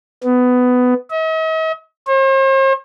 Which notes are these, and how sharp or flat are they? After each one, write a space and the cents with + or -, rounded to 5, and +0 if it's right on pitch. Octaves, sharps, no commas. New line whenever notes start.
B3 +15
D#5 +45
C5 +45